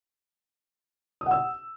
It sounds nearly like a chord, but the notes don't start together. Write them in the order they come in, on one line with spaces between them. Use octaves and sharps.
D#6 F#5 E6